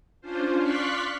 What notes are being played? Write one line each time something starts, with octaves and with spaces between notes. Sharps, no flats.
C#4 D4 F4 C5
D5 F5 C6 C#6 F#6 B6